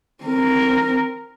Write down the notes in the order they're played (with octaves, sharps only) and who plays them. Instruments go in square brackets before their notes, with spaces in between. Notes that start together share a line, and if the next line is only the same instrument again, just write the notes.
[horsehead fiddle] C4 A#4